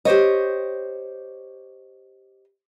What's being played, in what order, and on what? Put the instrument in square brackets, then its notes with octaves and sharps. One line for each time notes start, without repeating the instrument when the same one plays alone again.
[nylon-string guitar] G4 C5 C#5 D#5